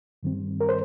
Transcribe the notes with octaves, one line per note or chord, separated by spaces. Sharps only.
G2 D#3 G3 C4
A#4
C5